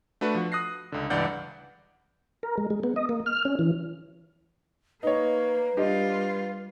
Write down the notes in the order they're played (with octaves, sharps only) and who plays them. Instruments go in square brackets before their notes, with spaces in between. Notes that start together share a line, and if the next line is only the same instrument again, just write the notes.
[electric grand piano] A3 D4 F#4 B4
F3 F#4
D#6 F#6 A#6 C7
C#2 D3
C#2 G2 E3 D5 F#5 G6
[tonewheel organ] A#4
G#3
G#3
B3
D#5
A#3
F6
C#4
E3
[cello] A#3 [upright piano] D#4 C#5 [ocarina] B4
[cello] G3 F4 [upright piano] D4 G4 D#5